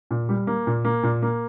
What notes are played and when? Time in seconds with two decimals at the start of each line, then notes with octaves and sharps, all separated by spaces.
0.11 A#2
0.29 G3
0.47 A#3
0.67 A#2
0.85 A#3
1.03 A#2
1.22 A#3